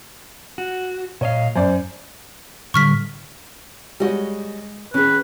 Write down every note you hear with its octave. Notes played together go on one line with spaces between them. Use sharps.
F#4
A#2 C#5 D#5 F5
F#2 C5 D5
A2 D3 G3 C#6 F6 B6
G3 G#3 F#4 C#5 D#5
D#3 C#4 G#4 B4